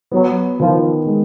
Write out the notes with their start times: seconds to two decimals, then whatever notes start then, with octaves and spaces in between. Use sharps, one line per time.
0.12 F#3 B3
0.59 D#3 F3
1.06 G#3